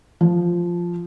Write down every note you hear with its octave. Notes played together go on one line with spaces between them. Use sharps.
F3